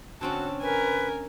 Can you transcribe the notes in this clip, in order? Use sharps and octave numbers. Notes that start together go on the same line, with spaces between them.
D3 C4 C#4 F#4 A5
A#4 B4 G#5